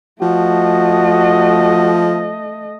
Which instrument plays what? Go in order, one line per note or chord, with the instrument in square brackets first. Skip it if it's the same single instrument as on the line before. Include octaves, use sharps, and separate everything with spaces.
[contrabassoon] F3 [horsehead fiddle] A3 D#5 [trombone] F#4